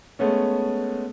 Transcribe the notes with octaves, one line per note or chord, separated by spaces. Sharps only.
G#3 A3 B3 C#4